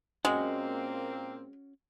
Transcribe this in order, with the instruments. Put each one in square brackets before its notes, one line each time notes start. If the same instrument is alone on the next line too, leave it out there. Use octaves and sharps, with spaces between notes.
[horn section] A#2 A#3 C4 [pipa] G#3 [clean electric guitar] C#4 F#4 F#5